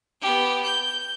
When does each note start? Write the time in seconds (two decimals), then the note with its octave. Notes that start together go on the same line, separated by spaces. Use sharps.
0.21 B3 G4
0.64 G6